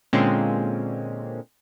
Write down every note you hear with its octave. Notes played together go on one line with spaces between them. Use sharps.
A#2 D3 G#3 A#3 C4 C#4